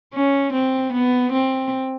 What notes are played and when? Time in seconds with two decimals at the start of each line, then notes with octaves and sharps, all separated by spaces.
0.14 C#4
0.53 C4
0.93 B3
1.33 C4